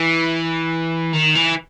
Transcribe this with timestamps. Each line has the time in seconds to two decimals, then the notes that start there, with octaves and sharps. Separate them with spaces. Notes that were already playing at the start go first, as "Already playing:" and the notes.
Already playing: E3
1.13 D#3
1.35 E3